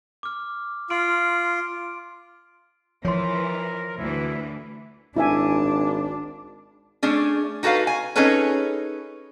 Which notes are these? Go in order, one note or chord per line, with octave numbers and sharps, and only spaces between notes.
D6 F6
F4 C6 F6 D7
E3 F3 A#4 C#5 C6
D2 E3 E4
G#1 D4 E4 E5 G#5
A3 C#4 D4 G#4
D#4 F#4 A4 B4 F5
G#5
C#4 D#4 G#4 A4 B4 C#5